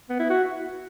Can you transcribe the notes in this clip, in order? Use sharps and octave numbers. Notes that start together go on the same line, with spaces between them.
B3
E4
F#4